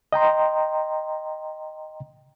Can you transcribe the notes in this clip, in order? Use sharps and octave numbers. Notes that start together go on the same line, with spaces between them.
D#5 G5 A#5 C6